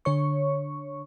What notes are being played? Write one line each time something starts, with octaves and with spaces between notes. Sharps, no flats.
D3 C#5 C#6